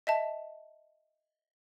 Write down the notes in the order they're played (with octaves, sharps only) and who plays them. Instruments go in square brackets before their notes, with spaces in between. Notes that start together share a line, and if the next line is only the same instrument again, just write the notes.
[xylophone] D#5 E5 A5